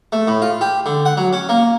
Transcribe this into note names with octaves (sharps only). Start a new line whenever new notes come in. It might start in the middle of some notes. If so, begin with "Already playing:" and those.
A3
A2
F4
G4
D3
F#5
F#3
C#4
A#3